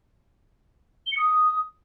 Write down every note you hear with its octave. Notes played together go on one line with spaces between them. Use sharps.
G7
C#7
D#6